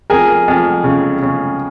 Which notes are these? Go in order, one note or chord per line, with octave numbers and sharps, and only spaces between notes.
F2 G#4 A#4
F2
C#3
C#3